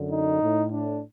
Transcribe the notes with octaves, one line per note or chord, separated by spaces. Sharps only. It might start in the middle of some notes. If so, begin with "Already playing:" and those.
Already playing: F#2 D3
D#4
A2
D4